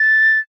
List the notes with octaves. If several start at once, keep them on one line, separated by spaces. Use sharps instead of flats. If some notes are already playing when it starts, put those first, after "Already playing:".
Already playing: A6